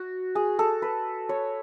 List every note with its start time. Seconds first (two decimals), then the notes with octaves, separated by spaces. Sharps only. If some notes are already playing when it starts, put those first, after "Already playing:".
Already playing: F#4
0.35 G#4
0.59 A4
0.82 B4
1.29 C#5